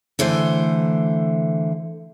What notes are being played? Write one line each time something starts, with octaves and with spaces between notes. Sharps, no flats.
D3 E3 A3 C5